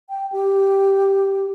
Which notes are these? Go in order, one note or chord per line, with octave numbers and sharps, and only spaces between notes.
G5
G4